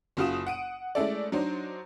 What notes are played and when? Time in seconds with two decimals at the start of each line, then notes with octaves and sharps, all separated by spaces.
0.17 F#1 C#3 F4 F#4 D#6 E7
0.47 F#5 D7 D#7
0.95 G#3 A3 C#4 E4 A4 D5
1.32 F#3 D4 D#4 C5